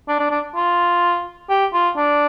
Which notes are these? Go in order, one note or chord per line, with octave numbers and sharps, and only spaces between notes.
D4
D4
D4
F4
G4
F4
D4